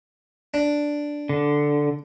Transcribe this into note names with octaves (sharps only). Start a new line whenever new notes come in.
D4
D3